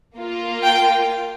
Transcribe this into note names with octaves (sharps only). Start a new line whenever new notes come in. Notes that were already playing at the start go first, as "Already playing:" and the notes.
A#3 F4
G5